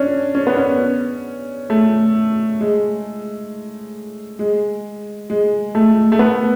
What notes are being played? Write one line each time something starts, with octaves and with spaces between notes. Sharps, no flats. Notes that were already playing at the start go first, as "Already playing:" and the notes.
Already playing: C#4 D4
C#4
B3
C#4
A3
G#3
G#3
G#3
A3
A3
B3